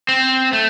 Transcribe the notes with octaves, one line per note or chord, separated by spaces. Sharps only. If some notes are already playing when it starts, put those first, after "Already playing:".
C4
A3